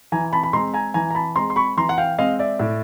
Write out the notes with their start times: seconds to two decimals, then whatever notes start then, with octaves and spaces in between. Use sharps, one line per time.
0.12 E3 G#5 A#5
0.33 A5 B5
0.43 B5
0.53 G#3 C4 A#5 C6
0.74 G#5 A#5
0.94 E3 G#5 A#5
1.11 A#5
1.15 A5 B5
1.36 G#3 C4 A#5 C6
1.50 C6
1.56 B5 C#6
1.77 E3 A#5 C6
1.89 F#5
1.98 F5 G5
2.18 G#3 C4 D#5 F5
2.39 D5 E5
2.60 A2